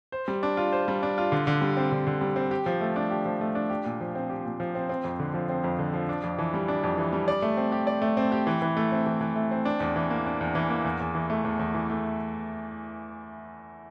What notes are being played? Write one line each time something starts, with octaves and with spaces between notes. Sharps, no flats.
C5
G3
D4
F4
C5
G3
D4
F4
D3
D3
G3
C4
D3
D3
G3
C4
G4
F3
A3
D4
G4
F3
A3
D4
G4
A#2
F3
C4
G4
A#2
F3
C4
C4
F2
D3
F3
C4
F2
D3
F3
D4
F2
E3
G3
D4
F2
E3
G3
D5
A3
C4
G4
D5
A3
C4
G4
E3
E3
A3
C4
E3
E3
A3
C4
D4
E2
E3
A#3
D4
E2
E3
A#3
E2
E2
E3
A3
E2
E2
E3
A3